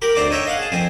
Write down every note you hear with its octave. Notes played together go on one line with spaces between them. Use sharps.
G4 A#4 B5
D2 C4 D5 A#5 D6
D#4 C#5 E5 G5
D#5 F5 F#5
G#4 A5
F2 C4 G#5